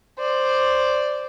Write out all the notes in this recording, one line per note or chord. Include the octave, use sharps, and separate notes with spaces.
C5 D5